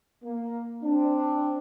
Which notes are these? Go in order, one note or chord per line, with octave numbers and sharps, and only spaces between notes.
A#3
C4 D4